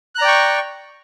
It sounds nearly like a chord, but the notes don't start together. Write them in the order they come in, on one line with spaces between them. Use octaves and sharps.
F#6 A#5 D5 G5 C#6